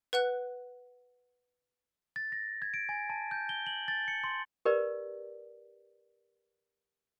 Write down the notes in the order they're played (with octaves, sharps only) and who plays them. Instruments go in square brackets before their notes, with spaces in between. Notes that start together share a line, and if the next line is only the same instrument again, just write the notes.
[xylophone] B4 F#5 F#6
[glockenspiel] A6
A#6
G#6
D7
G#5
A5
G6
G7
F#7
A6
C#7
C6
[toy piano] G4 A#4 B4 D5